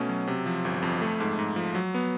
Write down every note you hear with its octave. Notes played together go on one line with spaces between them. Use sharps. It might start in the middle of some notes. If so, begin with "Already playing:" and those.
Already playing: B2 A3 C#4
F#3
C3
F3
G1
F2
A3
G#2
G#2
F3
F#3
B3